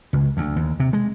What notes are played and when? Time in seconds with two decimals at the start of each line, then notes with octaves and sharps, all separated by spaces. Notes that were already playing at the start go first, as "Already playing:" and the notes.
0.13 C#2
0.37 D2
0.56 D#2
0.80 C3
0.93 G#3